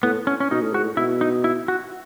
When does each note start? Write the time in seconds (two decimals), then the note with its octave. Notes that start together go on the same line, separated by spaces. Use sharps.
0.03 A2 B3
0.27 C#4
0.40 C#4
0.51 B2 D#4
0.61 A2
0.73 G#2 F#4
0.84 A2
0.97 B2 E4
1.21 D#4
1.44 E4
1.68 F#4